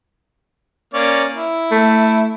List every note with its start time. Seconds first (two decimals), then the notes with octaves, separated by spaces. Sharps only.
0.94 A#3 C#4 D5
1.34 E4
1.71 A3